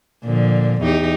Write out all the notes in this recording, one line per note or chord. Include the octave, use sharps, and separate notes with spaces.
A#2 D3 F3
E2 D#4 G4